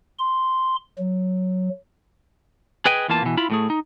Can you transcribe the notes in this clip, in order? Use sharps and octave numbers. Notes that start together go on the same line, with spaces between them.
C6
F#3
G#4 B4 D#5 G5 G#5
E2 E3 A#3 F4 A5
B2 E3
E4 F4 B5
A2 A3 G#4
D#4